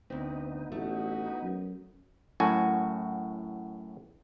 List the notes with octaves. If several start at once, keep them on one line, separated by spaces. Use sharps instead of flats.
D2 B3 C4 D#4
A1 A3 F#4
F#2
F#2 A2 F#4 G#5